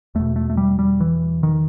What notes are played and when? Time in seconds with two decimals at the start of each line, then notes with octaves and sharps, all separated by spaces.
0.15 E2 B2 A3
0.36 A3
0.50 A3
0.57 G3
0.79 G3
1.00 E3
1.43 D#3